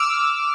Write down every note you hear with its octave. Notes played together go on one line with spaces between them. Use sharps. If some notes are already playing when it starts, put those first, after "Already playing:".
Already playing: D6 E6 F6